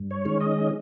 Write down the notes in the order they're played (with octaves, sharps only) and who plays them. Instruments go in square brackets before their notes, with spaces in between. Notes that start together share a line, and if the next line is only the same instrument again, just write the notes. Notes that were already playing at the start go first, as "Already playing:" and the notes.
Already playing: [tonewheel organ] G2
C#5
D#3 G#3 C#4
D#5